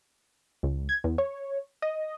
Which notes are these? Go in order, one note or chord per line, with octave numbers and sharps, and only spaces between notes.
C#2
G#6
E2
C#5
D#5